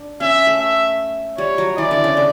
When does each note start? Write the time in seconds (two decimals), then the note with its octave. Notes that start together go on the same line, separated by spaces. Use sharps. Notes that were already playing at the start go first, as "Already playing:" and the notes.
Already playing: D4
0.20 C#4 E5
0.47 A3
0.60 E5
1.38 G3 C#5
1.58 F#3
1.78 E3 D5
1.91 D3
2.04 C#3
2.17 D3